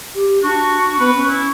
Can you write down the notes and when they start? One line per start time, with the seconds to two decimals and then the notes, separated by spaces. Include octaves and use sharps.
0.15 G4
0.43 D4 F#4 C#6
0.99 B3 B4
1.15 C#4
1.29 E4 C#6